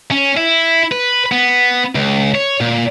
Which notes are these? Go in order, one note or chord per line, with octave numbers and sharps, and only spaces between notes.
C#4
E4
B4
B3
C#2
C#5
A#2